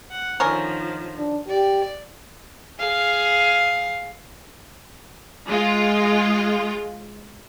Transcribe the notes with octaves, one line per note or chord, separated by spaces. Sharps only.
F#5
D3 D#3 F3 C#4 A#4
D4
G4 D5
G#4 F5
G#3 F4